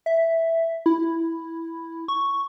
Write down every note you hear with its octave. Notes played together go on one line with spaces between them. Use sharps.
E5
E4
C#6